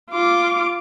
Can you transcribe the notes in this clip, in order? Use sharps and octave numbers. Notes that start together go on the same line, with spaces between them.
F4 D6